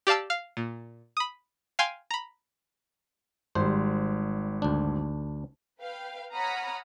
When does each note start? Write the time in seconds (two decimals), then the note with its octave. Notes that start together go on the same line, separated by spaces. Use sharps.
0.07 G4 D5 F5 A5 E6
0.30 F5
0.57 A#2
1.17 B5 D#6
1.79 F5 G5 G#5 C6
2.11 A#5 B5
3.55 G#1 G3 C5
4.62 D2 D4
5.80 B4 F5 G5
6.34 C#5 F#5 A#5 B5 D#6 F6